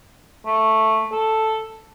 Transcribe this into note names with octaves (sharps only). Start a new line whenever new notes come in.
A3
A4